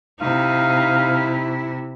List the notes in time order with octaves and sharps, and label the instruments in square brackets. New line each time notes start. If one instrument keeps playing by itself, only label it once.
[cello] C3 E4 [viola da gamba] D#4 [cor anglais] F5